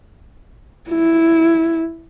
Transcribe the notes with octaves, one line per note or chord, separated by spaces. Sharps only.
E4